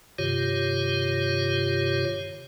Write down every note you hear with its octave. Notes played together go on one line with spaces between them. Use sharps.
G2 C3 D#3 F4 G4 C#5